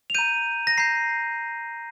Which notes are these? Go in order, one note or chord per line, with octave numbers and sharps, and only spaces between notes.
F7
A#5 G6 D#7
A#6
A#5 G6 C7